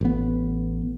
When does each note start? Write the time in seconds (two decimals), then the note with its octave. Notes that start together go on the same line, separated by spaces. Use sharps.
0.01 A1 B3